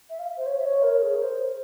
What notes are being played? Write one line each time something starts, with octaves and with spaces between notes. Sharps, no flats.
E5
F5
C5
C#5
E5
C#5
A#4
G#4
C5